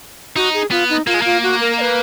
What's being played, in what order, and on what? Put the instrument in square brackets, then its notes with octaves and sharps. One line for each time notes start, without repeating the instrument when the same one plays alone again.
[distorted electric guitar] D#4 [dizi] F#4
[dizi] G#4
[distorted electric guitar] B3 [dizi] F4
[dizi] D#4
[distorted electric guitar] A#3 [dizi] F4
[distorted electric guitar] G#3
[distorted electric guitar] A#3 [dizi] F4
[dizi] F#4
A#4
D#5
B4